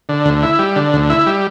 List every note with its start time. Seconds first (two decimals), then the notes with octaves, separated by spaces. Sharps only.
0.09 D3
0.25 D2
0.43 E4
0.59 G3
0.76 D3
0.93 D2
1.10 E4
1.26 G3